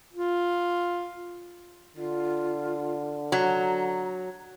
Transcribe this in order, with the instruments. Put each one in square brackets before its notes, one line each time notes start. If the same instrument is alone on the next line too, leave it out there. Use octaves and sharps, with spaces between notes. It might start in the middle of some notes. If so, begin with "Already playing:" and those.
[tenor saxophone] F4
[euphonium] D3 [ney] F4
[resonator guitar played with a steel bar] F#3 [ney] A#5